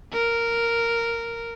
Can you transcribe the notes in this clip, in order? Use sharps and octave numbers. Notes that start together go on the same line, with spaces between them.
A#4